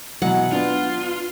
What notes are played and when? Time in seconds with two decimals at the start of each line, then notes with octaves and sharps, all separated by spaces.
0.22 B2 E3 F#3 F#5
0.52 B3 D4 F4